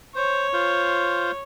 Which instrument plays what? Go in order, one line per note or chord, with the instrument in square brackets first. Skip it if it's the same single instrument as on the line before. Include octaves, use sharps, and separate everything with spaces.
[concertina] C5 [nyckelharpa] C#5
[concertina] F4 C5